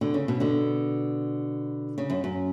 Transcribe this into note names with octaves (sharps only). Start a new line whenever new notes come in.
B2 D3
C#3
B2
B2 D3
C#3
F#2
F#2